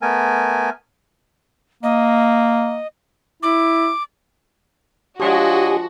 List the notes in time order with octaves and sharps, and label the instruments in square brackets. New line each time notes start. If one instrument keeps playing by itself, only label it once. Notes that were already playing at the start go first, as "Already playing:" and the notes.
[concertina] A3 B3 A#4 G#5
[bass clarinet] A#3 [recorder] D#5
[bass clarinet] E4 [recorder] D6
[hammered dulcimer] F3 G#3 [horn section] D4 C#5 D#5 [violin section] F#4 [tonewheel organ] G4 G#5